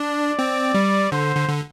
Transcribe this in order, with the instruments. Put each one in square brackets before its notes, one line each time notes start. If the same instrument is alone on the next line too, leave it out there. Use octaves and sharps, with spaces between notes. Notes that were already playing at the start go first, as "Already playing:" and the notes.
Already playing: [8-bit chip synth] D4 [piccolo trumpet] D5
[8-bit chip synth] C4
G3
[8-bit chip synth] D3 [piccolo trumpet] C5
[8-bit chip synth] D3
D3